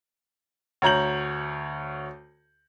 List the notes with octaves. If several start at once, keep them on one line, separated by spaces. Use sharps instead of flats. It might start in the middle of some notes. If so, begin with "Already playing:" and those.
D2 C#5 A#5 G6 F#7